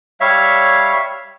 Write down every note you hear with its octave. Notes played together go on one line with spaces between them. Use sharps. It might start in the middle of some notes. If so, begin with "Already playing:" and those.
G3 C#5 E5 F5